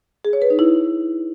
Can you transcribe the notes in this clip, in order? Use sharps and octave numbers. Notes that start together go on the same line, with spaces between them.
G#4
C#5
B4
D#4
E4